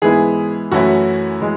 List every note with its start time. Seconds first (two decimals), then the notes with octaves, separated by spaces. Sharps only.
0.02 G#2 E3 G#3 B3 E4 G#4
0.71 F#2 E3 A3 C#4 E4 F#4
1.41 E3 G#3